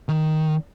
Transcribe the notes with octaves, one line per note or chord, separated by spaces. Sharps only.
D#3